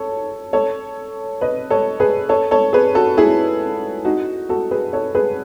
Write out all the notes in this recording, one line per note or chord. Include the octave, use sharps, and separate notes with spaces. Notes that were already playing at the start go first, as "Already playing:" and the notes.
Already playing: A4 C#5
A4 C#5
B4 D#5
A4 C#5
G#4 B4
A4 C#5
A4 C#5
G#4 B4
F#4 A4
E4 G#4
D#4 F#4
F#4 A4
G#4 B4
A4 C#5
G#4 B4